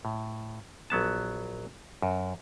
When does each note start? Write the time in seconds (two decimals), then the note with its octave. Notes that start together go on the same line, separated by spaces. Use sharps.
0.05 A2
0.90 A#1 F#3 B3 A5
2.02 F#2